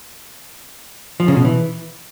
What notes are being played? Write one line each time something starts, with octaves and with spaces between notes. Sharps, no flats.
F3
C#3
B2
E3